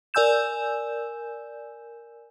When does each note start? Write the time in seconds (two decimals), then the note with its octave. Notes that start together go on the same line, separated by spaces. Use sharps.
0.14 A#4 D5 G#5 E6 G6 E7